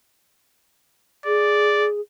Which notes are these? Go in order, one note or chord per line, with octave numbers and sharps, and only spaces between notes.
G#4 D5